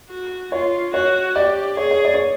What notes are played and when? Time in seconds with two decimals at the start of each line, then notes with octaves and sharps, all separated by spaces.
0.10 F#4
0.52 F4 C#5
0.94 F#4 C#5
1.35 G4 D5
1.77 G#4 C#5
1.91 C#5
2.05 D5
2.14 C#5